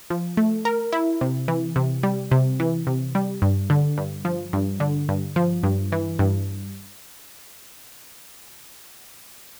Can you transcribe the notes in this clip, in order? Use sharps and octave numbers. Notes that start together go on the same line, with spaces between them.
F3
A3
A#4
E4
C3
E3
C3
G3
C3
E3
C3
G3
G2
D3
G2
F3
G2
D3
G2
F3
G2
E3
G2